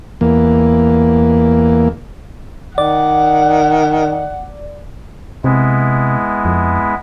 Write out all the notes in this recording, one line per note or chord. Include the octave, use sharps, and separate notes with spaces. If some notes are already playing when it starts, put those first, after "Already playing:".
E2 A#3
D#3 D5 F#5
C3 G#3 B3 E4
F2